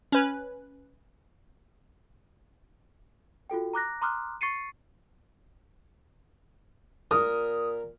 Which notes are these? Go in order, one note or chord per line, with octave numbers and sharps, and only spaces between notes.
C#4 B4
F4 F#4 A4 G5
A#5 D6 F#6 A#6
A#5 C6 D6 D#6 F6 F#6
C#6 A6 C7 C#7 D#7
A#2 A#4 D#6